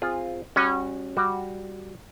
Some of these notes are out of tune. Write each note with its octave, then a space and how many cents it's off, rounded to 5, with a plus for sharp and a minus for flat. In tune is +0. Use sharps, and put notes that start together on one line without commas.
C4 +0 F4 +0 G#4 -15
G3 +20 C#4 -15 F#4 +0
G3 +0 F#4 +0